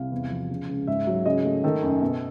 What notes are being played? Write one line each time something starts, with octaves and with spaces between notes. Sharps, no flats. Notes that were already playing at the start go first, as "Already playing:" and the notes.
Already playing: C2 F5
E2
F3
C#3
C#2
G#2 E5
F#3
C#3 D#5
A3
D#3 A4
F#2
B2